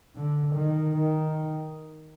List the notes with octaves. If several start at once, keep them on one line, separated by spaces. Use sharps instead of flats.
D3
D#3
D#3